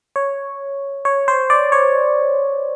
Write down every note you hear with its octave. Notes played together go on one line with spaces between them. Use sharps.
C#5
C#5
C5
D5
C#5